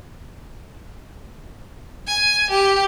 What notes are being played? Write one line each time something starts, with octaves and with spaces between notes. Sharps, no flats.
G#5
G4